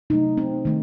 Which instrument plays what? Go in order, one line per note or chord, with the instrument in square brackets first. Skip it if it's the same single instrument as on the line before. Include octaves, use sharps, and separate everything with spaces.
[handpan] C3 F#3 A3 D#4
C4
D#3 A3